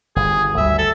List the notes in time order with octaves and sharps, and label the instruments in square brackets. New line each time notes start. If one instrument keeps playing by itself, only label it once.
[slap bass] G1 [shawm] G#4
[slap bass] D2 G3 [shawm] E5
[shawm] A4